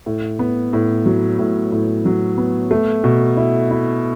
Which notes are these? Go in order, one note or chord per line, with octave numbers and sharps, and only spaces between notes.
A2
B3
A2
F#3
A2
A2
F#3
B3
A3
B2
E4
E4